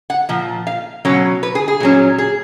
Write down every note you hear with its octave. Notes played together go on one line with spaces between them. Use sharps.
F#5
A#2 F3
F5
B2 F#3 C#4 C#5
B4
G#4
G#4
A#2 F#3 C#4
G#4